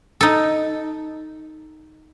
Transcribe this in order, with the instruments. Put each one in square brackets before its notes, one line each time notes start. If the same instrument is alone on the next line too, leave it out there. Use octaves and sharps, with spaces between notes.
[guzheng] D#4 A4